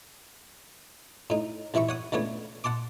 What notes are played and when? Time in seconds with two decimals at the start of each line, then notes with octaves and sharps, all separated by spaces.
1.30 A2 D#4
1.74 C2 E3 E4 E5 C#6
1.89 C#5 F#5 D#6
2.12 C#2 D3 A3 B3 C#5
2.64 F#5 A5 C6 D6